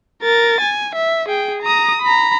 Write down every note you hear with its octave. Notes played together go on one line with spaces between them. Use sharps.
A#4 A6
G#5
E5
G#4 G5
A#5 D#6
A#5 B5